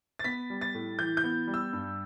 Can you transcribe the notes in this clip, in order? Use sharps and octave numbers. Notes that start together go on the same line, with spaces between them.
A6
B3 B6
G3
A6
A2
E3 G6
G6
B3
G3
E6
G2